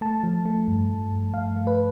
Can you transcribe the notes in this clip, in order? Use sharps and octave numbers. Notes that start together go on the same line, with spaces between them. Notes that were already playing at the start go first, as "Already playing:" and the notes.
A3 A5
F3
A3
G2
G2
G2
G2 F5
A3
B4